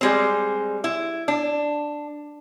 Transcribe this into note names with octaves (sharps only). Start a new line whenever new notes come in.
G3 G#3 C4
E4
D4